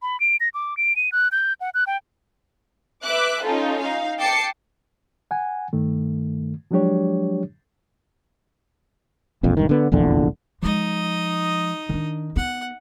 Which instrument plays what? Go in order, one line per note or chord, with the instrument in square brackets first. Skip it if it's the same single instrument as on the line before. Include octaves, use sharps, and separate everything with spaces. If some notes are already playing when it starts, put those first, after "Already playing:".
[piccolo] B5
D7
A#6
D6
D7
D#7
F#6
G6
F#5
F#6
G5
[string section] B4 E5 D6 F#6
C#4 D#4 F4 A4
D#4 F5
G5 A5 D6 A6 C7 C#7
[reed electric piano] F#5 G#5
G2 D#3 A3
F3 F#3 G#3 D4 G4 C#5
[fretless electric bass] E1 A#1 F2
E1 G2 D#3
D3 B3
F1 A#1 E2 D3
[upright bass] F3 G#3 [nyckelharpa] D#4 D#5
[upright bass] D#3 D4
[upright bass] B3 [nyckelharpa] F#5